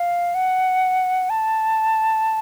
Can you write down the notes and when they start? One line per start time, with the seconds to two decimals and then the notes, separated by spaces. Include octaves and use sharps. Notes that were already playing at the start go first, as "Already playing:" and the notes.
Already playing: F5
0.35 F#5
1.30 A5